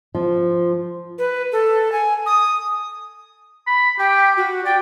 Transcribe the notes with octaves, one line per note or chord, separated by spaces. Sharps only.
F3
B4
A4
G#5
D#6
B5
G4 G5
F#4
D5 G5